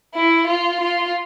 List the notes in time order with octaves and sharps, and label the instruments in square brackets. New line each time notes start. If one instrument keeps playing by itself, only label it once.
[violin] E4
F4
F4